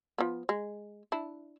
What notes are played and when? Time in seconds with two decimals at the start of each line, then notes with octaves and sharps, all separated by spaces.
0.18 F3 B3
0.49 G#3
1.12 D4 E4